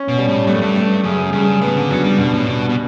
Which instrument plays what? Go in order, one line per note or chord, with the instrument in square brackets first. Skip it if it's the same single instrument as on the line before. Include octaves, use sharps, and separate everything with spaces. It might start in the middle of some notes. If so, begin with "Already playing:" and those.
Already playing: [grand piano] C#4
[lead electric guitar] B2
[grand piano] G3
[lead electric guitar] A2
[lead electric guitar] G2 [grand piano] A3
[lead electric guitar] F#2
G2
[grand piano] A3
[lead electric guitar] F#2 [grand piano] C#3
[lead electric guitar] G2 [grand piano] C#3
[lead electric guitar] A2 [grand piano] B3
[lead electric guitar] D3
[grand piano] G2 [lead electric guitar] F#3
[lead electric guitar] G3
[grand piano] G2 [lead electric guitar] B2
[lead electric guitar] A2
[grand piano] G2 [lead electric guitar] B2
[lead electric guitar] B2